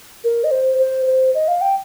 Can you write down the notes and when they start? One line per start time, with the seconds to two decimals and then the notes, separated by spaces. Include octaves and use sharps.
0.24 A#4
0.44 D#5
0.51 C5
0.78 C5
1.06 C5
1.35 D#5
1.48 F5
1.61 G5